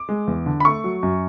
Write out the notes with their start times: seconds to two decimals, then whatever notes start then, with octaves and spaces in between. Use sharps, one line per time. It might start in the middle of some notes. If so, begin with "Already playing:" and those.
Already playing: D6
0.09 G#3
0.27 E2
0.46 D3
0.60 B5
0.65 A3 C#6
0.84 F#3
1.03 F#2